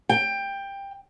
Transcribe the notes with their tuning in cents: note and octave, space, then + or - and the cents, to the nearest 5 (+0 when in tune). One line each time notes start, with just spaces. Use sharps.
G5 +15